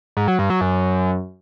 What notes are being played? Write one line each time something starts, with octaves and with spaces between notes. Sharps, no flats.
G#2
F#3
G2
F#3
F#2